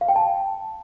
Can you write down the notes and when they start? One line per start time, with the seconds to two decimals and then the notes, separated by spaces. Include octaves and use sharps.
0.01 F5
0.08 G5
0.16 A5